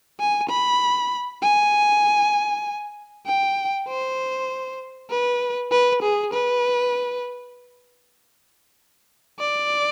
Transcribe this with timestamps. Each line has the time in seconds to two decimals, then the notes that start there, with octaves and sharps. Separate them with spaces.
0.20 G#5
0.50 B5
1.42 G#5
3.26 G5
3.88 C5
5.10 B4
5.71 B4
6.02 G#4
6.33 B4
9.40 D5